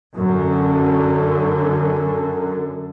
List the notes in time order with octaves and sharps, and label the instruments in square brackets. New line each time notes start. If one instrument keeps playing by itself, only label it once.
[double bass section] F#2 D3